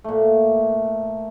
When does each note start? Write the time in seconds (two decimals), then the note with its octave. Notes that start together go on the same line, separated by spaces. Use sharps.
0.04 A#2 A3